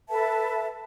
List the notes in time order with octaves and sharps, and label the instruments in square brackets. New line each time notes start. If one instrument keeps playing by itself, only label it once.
[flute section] A4 B4 E5 A5